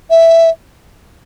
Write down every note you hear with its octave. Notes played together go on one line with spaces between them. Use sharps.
E5